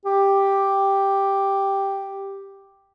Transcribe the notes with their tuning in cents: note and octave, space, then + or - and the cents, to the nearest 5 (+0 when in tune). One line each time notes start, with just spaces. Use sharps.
G4 +0